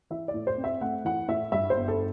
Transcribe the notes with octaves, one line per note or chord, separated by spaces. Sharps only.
E3 E5
D5
A2
C5
C4
E5
A3 F#5
E3 F#5
A2 E5
G2 E5
C5
G1
A4